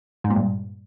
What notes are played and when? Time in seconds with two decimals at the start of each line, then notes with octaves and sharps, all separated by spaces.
0.24 G#2
0.30 A#2
0.36 G2